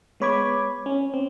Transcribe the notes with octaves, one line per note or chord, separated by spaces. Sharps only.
G#3 B3 C#5 B5 D6 G#6
C#4
C4